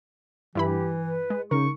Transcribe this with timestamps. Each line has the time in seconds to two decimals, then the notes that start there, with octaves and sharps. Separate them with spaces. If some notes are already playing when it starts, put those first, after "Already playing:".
0.55 G2 E3 E4 G4 B5
1.01 B4
1.30 G#3
1.51 C#3 D#4 A#4 C#6